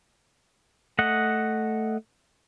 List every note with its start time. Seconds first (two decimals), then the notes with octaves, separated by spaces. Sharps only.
0.99 A3 D#5 F#5